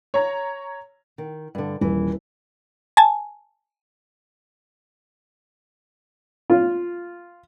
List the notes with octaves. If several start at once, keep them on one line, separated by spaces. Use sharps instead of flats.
C#5 A#5
D#3
G2 D3
D#1 E3
G#5 A5
F4